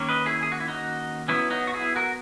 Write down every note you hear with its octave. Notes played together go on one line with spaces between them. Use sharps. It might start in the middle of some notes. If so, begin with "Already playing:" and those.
Already playing: D#3 A#3 C#4
B4 D#5
E4 G#4
G#4
F#4
E4
D#4 F#4
F#3 B3 C#4 E4
D#4 F#4
F#4
E4 G#4
F#4 A#4